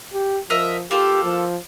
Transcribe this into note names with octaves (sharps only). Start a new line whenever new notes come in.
G4
F3 A#4 D#5 E5
A#3 F4 G4 A4
F3